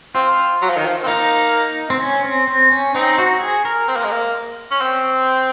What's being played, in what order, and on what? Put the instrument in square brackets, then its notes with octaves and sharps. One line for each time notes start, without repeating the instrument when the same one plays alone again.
[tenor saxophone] C4 [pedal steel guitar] F4
[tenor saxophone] F#3
F3
D#3
F3
C4
[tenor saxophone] A#3 [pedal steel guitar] D#4
[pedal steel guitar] C4
C#4
C4
C4
C#4
[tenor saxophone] C4 [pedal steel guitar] D#4
[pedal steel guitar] F#4
G#4
A#4
[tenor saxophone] C4
A#3
G#3
A#3
C#4
C4